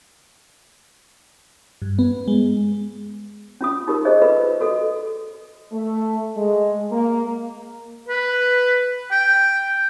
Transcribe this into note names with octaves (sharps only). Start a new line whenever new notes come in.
G2
B3
G#3
C#4 F4 D#6
D#4 F4 G4 A#4
G#4 C5 D#5
F4 A4 B4
F#4 A4 D#5 D#6
A3
G#3
A#3
B4
G5